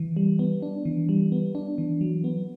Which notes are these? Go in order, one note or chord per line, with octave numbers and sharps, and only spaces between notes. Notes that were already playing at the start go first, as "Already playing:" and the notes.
Already playing: E3
G3
B3
D4
E3
G3
B3
D4
E3
F#3
B3